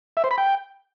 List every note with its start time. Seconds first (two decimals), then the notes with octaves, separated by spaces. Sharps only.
0.17 E5
0.24 C5
0.31 B5
0.38 G5